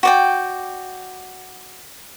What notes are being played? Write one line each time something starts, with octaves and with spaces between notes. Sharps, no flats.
F#4 D5 G5